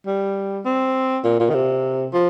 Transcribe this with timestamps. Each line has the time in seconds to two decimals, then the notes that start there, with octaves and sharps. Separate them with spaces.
0.07 G3
0.65 C4
1.24 A#2
1.40 A#2
1.50 D#3
1.54 C3
2.13 F3